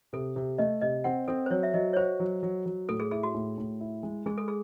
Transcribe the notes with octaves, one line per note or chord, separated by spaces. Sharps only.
C3 A4
C3
A3 D#5
C3 D#5
C4 F#5
C4 A4
C5
F#3 C#5
E5
F#3 D#5
C#5
F#4 C5
F#3
F#3
F#3
A2 A4
G#4
E4 G#4
F#4
A2
A2
E4
G#3
G#3 G#4
A4
G#4